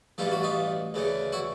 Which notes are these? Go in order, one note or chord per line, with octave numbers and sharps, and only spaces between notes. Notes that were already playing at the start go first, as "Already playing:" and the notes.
A1 G2 E3 A3 F4
F#4
D#4 F4
D2 C#3 E3 A3
E4 F#4